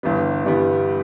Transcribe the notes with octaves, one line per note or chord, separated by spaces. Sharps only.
G1 G2 E3 G3 B3
G1 G2 E3 G3 B3